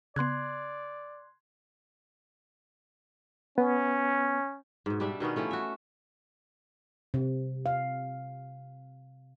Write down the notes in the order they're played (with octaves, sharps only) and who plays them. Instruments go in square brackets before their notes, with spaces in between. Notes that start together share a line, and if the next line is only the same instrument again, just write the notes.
[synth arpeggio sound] C#3 B3 [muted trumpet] D5 [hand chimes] C6 F#6 G#6
[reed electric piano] B3 [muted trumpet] C#4
[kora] G#2 B2
G3 D4 E5
B2 D#3 B3 C#4
E3 F3 A3 C#4
F#4 E5
[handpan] C3
F5